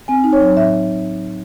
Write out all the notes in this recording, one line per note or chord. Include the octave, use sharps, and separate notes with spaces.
C4 G#5
D#4
C#5
F#3
A2 E5